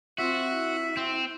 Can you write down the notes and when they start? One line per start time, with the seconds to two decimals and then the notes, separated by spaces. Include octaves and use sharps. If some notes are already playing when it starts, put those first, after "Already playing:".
0.18 C4 F4 F#4 E5
0.52 E4
0.97 C4